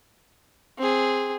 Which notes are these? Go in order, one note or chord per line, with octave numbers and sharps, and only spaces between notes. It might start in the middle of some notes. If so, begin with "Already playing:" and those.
C4 G#4